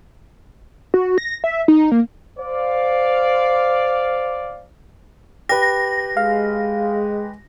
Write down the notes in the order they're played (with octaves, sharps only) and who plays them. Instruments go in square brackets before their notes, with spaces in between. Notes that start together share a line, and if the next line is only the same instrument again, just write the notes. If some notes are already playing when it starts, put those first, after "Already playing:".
[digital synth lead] F#4
A#6
E5
D#4
A#3
[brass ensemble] C5 D5 F5
[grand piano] G4 B4 [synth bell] A#6
[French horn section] G#3 [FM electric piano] F5